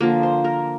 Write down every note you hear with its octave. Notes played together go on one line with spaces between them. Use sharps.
D3 F3 A#3
C5
A#4